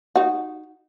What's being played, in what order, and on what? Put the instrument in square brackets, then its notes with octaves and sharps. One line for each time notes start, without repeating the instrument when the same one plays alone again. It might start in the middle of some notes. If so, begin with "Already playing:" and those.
[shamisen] D#4 F#4